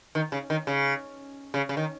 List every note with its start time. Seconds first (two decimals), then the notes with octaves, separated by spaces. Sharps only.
0.15 D#3
0.32 C#3
0.50 D#3
0.67 C#3
1.54 C#3
1.69 C#3
1.77 D#3